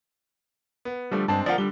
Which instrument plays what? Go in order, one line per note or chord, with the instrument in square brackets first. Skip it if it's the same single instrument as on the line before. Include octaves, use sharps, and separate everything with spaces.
[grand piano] B3
[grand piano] D3 F3 A3 [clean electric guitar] G3
[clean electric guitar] G2 A5 [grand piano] G#3 C4 D4
[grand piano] F3 F4 A#4 [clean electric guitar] D5 F5 F#5
[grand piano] D3 G7 [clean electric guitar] G3